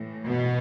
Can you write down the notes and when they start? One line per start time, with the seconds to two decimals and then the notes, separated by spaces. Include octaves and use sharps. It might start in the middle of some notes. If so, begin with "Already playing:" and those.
Already playing: A2 E3
0.25 B2 B3